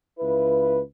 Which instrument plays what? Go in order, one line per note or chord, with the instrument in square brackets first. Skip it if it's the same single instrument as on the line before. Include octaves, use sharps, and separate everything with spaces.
[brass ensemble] C#2 E4 F4 B4